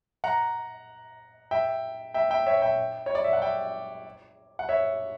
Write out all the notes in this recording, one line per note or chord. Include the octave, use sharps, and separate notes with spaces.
F#5 A#5
E5 G5
E5 G5
E5 G5
C#5 E5
E5 G5
C#5
D5
E5
F#5
E5 G5
F#5
C#5 E5